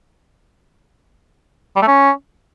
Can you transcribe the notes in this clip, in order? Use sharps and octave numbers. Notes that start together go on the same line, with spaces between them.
G3
A3
C#4